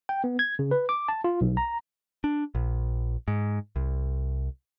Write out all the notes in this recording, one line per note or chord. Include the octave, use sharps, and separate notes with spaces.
G5
B3
G#6
C#3
B4
D6
A5
F4
B1
A#5
D4
A#1
G#2
C2